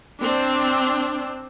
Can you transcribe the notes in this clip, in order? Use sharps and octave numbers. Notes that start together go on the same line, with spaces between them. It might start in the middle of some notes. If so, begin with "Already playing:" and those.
C4 D4